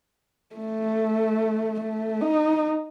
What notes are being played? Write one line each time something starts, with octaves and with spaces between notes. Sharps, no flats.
A3
A3
D#4